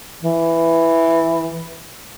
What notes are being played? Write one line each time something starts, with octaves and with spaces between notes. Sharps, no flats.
E3